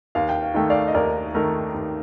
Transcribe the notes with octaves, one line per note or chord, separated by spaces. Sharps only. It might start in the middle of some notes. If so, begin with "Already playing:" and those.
D#2 F5
G5
F5
D#3 A3 G5
D5 F5
D#5
D#2 A#4 D5
D#3 A3 A#4
D#2